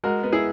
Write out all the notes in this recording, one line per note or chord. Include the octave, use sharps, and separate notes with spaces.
G#3 F#4 A#4
B3
E4 G#4